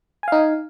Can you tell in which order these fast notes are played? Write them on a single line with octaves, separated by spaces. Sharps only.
G#5 F5 D#4